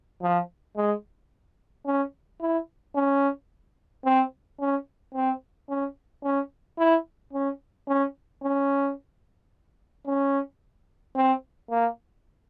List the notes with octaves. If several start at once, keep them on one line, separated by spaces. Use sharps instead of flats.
F3
G#3
C#4
E4
C#4
C4
C#4
C4
C#4
C#4
E4
C#4
C#4
C#4
C#4
C4
A#3